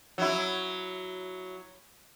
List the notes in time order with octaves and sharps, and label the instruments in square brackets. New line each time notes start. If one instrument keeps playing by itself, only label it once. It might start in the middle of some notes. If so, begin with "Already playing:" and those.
[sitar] F#3 E4